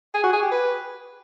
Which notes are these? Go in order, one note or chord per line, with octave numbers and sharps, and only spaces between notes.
G#4
F#4
G#4
G4
B4